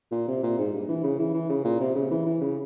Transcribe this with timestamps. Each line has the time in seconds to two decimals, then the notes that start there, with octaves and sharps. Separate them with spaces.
0.12 A#2
0.28 C3
0.43 A#2
0.59 G#2
0.74 G2
0.88 E3
1.04 C#3
1.19 E3
1.34 E3
1.50 C#3
1.65 A#2
1.80 C3
1.95 C#3
2.11 E3
2.26 E3
2.41 C#3